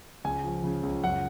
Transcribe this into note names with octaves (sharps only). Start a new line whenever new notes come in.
C#2 G#5
F3
C#3
C#2
F#2 F#5